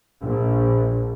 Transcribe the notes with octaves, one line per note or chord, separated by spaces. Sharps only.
A#1